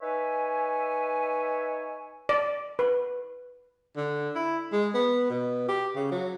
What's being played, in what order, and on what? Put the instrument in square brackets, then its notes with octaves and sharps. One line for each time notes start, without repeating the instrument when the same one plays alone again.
[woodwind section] D#4 B4 C#5 E5 G#5
[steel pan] D5
B4
[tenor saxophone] D3
E4
G#3
B3
B2
G4
C#3
F#3